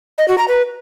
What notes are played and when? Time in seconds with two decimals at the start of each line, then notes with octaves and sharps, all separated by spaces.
0.18 D#5
0.28 F#4
0.38 A#5
0.48 B4